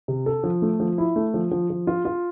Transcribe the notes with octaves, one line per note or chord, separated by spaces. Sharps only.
C3
A4
F3
A3
F3
E4
A3
F3
F3
F3
F4
F4